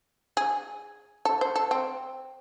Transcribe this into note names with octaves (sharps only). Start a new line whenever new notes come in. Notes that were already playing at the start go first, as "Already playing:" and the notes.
G#4
A4
C5
A4
C4